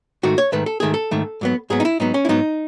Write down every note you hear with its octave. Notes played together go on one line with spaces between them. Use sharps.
G#2 D#3 A3 F#4
C#5
G#2 D#3 A3 B4
A4
G#2 D#3 A3 G#4
A4
G#2 D#3 A3
G#2 F#3 B3
G#2 F#3 B3 G#4
D#4
E4
G#2 F#3 B3 D#4
C#4
E4
G#2 F#3 B3 D#4